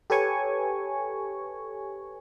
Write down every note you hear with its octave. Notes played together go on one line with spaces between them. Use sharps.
G4 A4 B4 C#5 G#5 C#6